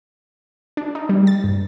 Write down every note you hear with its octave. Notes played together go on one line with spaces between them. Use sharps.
D4
D#4
G3
A6
G2